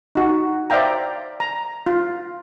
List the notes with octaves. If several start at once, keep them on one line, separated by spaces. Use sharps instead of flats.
D#4 F#4
C5 D5 E5 F5 G5 A#5
A#5
F4